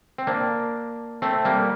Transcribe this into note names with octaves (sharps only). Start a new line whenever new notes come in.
C4
A#3 D4
A3 C4
G3 A#3